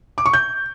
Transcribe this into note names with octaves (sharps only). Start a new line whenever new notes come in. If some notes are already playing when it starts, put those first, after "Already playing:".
D6
C#6
G6